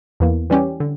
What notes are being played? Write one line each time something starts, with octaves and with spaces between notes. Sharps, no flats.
E2 E3 A#3
E3 G3 C#4 G4
D3